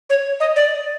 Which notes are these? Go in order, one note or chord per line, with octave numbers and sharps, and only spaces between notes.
C#5
D#5
D5